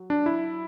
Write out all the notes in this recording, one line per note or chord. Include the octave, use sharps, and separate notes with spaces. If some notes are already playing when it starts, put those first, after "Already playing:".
Already playing: F#3
D4
E4